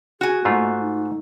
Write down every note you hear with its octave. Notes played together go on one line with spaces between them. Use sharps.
F#4 G#4 G#5
G#2 A3 A#3 F4
D#4